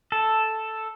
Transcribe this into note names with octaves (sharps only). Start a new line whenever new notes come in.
A4